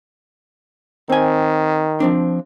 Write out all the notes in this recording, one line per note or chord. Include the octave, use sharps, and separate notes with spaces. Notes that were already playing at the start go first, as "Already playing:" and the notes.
D#3 C4 G#5
F3 C4 D4